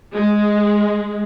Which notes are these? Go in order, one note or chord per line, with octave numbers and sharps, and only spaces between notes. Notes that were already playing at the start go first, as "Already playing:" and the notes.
G#3